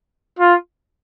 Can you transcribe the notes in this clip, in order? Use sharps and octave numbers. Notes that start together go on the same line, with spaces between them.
F4